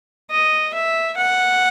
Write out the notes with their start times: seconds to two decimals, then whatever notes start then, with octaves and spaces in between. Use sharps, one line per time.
0.31 D#5
0.74 E5
1.17 F#5